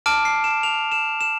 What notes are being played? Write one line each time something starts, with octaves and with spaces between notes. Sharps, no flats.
A5 D6 F6 D7
C7
E7
F7
E7
E7